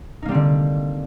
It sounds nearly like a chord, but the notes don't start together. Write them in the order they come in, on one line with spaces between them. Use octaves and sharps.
D#4 A#3 G3 C4 D3